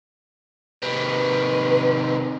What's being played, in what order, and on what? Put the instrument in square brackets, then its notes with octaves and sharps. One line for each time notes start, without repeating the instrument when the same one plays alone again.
[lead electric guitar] C3 D#3 [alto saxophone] B4